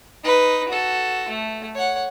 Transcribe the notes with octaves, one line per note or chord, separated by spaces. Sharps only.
D#4 B4
F#4 A4
A3
C#5 F#5